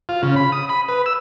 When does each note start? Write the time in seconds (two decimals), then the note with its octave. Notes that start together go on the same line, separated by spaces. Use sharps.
0.09 F4
0.23 C#3
0.36 B5
0.52 D#6
0.69 B5
0.88 B4
1.06 E6